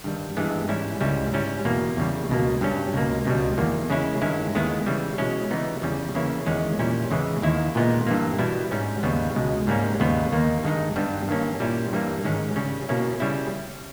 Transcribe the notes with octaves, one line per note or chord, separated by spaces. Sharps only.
G2 D#3 G3
G2 E3 G#3 B3
G#2 G3 C#4 E4
C#2 C#3 G3 C#4 E4
G#2 G3 C#4 E4
E2 B2 A#3
E2 C#3 G3
C#2 B2 A#3
G2 G3 C#4
C#2 B2 A#3
C#2 B2 G3
E2 D#3 A#3
C#3 G#3 C#4 E4
G2 D#3 G#3 C#4 E4
D#2 D#3 G#3 B3 E4
C#3 E3 G3
B2 G#3 C#4 E4
C#3 E3 G3 B3 D#4
E2 C#3 G3 C#4
C#3 E3 A#3 C#4 E4
E2 D#3 G#3 C#4
A#2 G3 C#4 E4
E2 C#3 E3 G#3
D#2 D#3 A#3 E4
A#2 G#3 B3 D#4
G2 E3 A#3
B2 G3 B3 E4
G#2 G3 C#4
D#2 C#3 G3 B3
C#2 B2 G#3
G#2 G3 A#3 C#4
D#2 C#3 G3 B3
D#2 D#3 A#3 D#4
G2 D#3 G#3 D#4
G2 G3 B3
G2 D#3 A#3 C#4
A#2 G3 C#4 E4
G2 E3 G3 A#3
G#2 D#3 G#3 C#4
C#3 G3 C#4
B2 A#3 C#4 E4
C#3 G3 C#4 E4